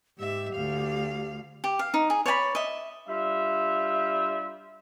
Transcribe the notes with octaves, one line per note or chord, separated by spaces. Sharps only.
G#2 G4 E5
D2 F5
G4
F5
D#4
G#4
C#5 D5 G#5 B5
D#5 E5
G3 D4 F4 E5